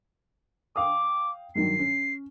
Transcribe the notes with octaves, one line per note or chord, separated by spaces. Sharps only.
F5 G5 D6 D#6
G2 D#3 F#3 C7
C#4